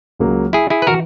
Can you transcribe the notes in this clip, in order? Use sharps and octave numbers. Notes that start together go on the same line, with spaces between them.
C#2 C#3 F#3 A#3
E4 G#4
E4 G#4
B4
E3 F#4 A#4